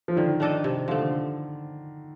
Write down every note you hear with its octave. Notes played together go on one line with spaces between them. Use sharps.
F3
D3 D#3
A3 D4 A4 D#5
C3
D3 F3 A3